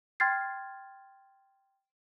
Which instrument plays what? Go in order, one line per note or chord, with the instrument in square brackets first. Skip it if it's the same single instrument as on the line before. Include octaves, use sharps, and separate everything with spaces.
[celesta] G5 C6 F6 G#6 A6 C7